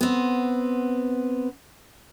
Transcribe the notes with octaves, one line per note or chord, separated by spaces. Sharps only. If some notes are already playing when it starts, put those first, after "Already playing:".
B3 C4